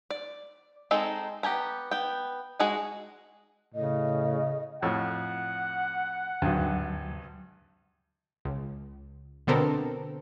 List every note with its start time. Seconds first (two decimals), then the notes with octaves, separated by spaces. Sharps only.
0.10 D5
0.91 G#3 C4 D#4 A4
1.43 B3 G4 G#5 A#5
1.91 B3 G5
2.60 G#3 F#4 G#4 F#5 G#5
3.74 A2 C#3 D#5
4.82 F2 A2 F#5 E6
6.42 G#1 D2 G2 F#3
8.45 C#2
9.47 B2 D3 B3 C4 A4 A#4